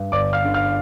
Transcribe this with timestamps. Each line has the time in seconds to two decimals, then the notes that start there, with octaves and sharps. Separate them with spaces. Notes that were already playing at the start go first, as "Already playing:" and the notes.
Already playing: G2
0.12 G1 D5 D6
0.33 F5 F6
0.44 D3
0.54 F5 F6